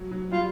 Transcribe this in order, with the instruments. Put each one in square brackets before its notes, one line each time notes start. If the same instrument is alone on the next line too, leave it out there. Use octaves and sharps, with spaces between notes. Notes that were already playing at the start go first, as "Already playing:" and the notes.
Already playing: [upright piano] F#3
F#3
[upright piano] G3 [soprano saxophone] F4